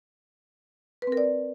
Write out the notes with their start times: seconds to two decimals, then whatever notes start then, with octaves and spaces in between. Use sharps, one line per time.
1.02 B4
1.07 C4
1.12 A#4
1.17 D5